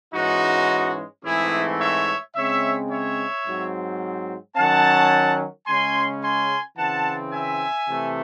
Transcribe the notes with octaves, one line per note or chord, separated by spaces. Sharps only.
G#2 E3 G#3 C#4 D#4 F#4
G#2 E3 A3 C4 E4 G#4
C#5 E5
C#3 G#3 C4 C#5 E5
C#5 E5
G#2 F#3 C4
D#3 F#3 C#4 F#5 A5
C#3 G#3 C#4 G#5 C6
G#5 C6
C#3 E3 C4 F#5 A5
E5 G#5
C3 E3 A3